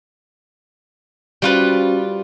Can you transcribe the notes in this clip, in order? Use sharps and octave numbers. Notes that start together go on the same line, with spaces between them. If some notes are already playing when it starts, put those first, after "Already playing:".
G3 C#4 F4 F#4 B4 C5